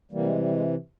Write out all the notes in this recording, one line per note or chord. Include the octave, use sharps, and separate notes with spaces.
C3 E3 G3 A#3
G#3
G3
G#3